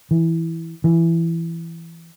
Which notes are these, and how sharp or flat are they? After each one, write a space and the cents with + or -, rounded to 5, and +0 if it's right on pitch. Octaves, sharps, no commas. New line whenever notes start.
E3 -5
E3 +15